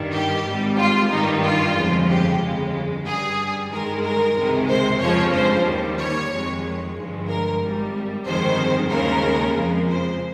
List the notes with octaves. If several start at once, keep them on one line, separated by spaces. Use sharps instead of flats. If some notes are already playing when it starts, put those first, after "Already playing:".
Already playing: G2 D#3 G3
G4
G#1 G#2 G3
F4
G2 D#3 G3 D#4
F4
G1 F2 C#3 F3 G#3
G4
G1 F2 C#3 G#3
G2 G3 G#4
G2 D#3 G#3 A#4
A#4
C#2 C3 D#3 G#3
C5
G1 F2 C#3 F3 G#3 C#5
C5
D#2 D#3 G3
C#5
F2 D#3 G#3
G1 G2 F3 G#3
A#4
G#1 G#2 G3
G1 F2 D#3 G#3 C5
D#2 C#3 G#3 A#4
F2 C#3 F3 G#3
C5